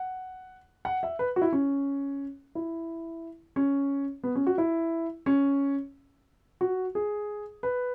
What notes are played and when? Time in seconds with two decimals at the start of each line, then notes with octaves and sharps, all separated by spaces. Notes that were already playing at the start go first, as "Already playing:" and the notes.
Already playing: F#5
0.85 F#5
1.03 E5
1.19 B4
1.36 F#4
1.42 E4
1.53 C#4
2.55 E4
3.56 C#4
4.24 B3
4.35 C#4
4.47 F#4
4.58 E4
5.26 C#4
6.61 F#4
6.95 G#4
7.63 B4